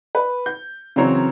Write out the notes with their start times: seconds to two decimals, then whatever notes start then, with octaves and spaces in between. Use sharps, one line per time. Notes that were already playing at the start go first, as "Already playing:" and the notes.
0.15 B4
0.46 G6
0.96 C#3 E3 F#3 C4 C#5 A#5